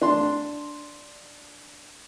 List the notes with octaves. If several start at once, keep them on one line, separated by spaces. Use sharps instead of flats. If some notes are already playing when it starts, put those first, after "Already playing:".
D4 C6